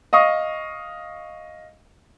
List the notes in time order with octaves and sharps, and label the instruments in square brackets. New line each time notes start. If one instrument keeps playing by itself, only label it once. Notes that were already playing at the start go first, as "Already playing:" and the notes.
[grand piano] D#5 F5 C#6 D#6